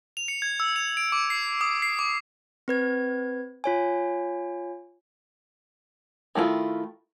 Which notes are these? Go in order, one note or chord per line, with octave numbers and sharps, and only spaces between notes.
F7
C#7
G#6
E6
F7
D7
D6
C7
D#6
C7
D6
C4 B4 G#6
F4 C#5 G#5
D#3 A3 E4 F4